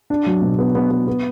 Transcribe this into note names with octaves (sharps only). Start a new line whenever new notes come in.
D4
F#3
B2
B3
B3
B3
B3